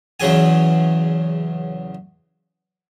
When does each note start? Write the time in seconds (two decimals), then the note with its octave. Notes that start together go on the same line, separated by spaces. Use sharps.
0.20 E2 C#3 F#3 G#4 G#5